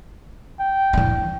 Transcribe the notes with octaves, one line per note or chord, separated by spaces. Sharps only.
G5
E3 D4